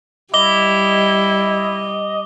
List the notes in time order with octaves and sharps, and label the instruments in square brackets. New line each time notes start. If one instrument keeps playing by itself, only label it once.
[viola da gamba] G3 [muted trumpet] E4 [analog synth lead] D#5 [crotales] D6 G7